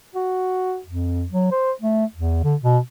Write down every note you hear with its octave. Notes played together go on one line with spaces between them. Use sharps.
F#4
F2
F#3
C5
A3
E2
D3
B2